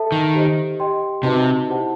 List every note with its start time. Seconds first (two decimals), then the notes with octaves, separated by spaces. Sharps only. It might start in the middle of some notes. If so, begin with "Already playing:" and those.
Already playing: A4 E5 A5
0.12 D#3
0.34 G4 C5 D#5
0.80 G4 D#5 G5 C6
1.23 C3 D#4 F#4 B4 D#5 A5
1.68 E4 G4 C5 F#5 A5